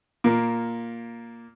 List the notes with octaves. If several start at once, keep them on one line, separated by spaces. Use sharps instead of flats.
A#2 A#3